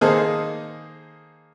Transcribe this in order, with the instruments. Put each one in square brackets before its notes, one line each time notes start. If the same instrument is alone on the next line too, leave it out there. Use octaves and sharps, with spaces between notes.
[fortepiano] D#3 A#3 D#4 G#4 A4 C5